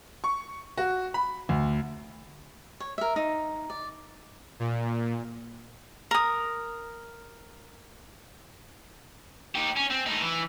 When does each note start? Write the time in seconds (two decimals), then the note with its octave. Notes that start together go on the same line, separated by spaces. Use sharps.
0.24 C#6
0.77 F#4
1.14 B5
1.49 D2
2.80 C#5
2.98 A#4 E5
3.16 D#4
3.70 D5
4.60 A#2
6.11 A#4 D#6
9.55 D#4 G4
9.77 C#4
9.91 C4
10.07 A2 D#4
10.22 E3